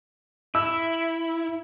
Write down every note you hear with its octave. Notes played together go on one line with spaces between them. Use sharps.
E4 E6